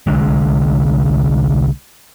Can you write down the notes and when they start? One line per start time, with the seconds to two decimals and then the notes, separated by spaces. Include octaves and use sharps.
0.07 C2 D3 G#3